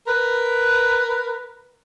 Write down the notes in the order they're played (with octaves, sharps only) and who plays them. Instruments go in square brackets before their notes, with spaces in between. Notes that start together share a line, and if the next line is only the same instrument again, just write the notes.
[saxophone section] A#4 B4